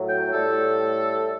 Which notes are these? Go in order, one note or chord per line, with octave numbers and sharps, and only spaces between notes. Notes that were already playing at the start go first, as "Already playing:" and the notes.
Already playing: A2 F#3
G5
A2 G3 A4